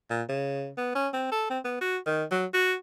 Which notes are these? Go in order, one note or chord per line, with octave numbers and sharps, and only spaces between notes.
A#2
C#3
B3
C#4
C4
A4
C4
B3
F#4
D#3
F#3
F#4